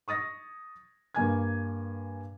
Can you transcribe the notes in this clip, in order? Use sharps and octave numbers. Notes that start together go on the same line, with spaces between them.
C#6 D#6 A6 A#6
G2 A#3 G#5 G#6